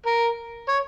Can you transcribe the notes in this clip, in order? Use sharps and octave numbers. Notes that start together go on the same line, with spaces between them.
A#4
C#5